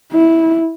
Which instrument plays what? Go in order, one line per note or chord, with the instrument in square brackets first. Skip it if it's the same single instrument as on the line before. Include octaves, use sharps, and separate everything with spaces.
[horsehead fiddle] E4